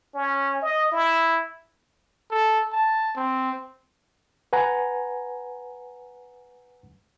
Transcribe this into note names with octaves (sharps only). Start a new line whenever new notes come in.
C#4
D#5
E4
A4
A5
C4
B4 F#5 G#5 A#5